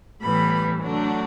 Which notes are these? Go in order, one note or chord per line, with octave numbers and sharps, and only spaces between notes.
A2 E3 G3 B3 B5
D3 F#3 A3 D4